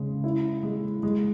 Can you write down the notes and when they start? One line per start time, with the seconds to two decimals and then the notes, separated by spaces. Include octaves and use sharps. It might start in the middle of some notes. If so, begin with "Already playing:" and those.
Already playing: C#3 G#3
0.24 E4
0.63 G#3
1.03 G#3